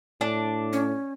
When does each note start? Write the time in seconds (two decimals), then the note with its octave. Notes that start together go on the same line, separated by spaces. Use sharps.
0.21 A2 D4
0.73 C#4